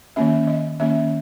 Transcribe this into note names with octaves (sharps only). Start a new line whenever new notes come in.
D#3 A#3 C#4 E5
D#5
D#3 A#3 C#4 E5